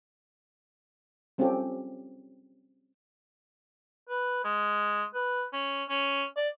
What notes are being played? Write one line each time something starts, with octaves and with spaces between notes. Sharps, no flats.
G3 C4 C#4 F4 G4 A4
B4
G#3
B4
C#4
C#4
D5